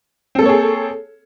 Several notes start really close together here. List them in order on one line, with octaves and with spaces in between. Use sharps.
C4 A4 A#3 C#5 G#4